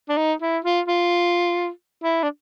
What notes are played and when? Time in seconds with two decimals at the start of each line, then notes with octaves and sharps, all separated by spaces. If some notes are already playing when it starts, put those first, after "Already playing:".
0.09 D4
0.17 D#4
0.42 E4
0.65 F4
0.88 F4
2.03 E4
2.23 D4